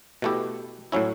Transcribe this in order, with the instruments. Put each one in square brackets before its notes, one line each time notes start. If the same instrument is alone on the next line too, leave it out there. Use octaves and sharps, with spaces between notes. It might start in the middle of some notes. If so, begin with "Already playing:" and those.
[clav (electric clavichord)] B2 A3 E4 G4
A2 F#3 C#4 E4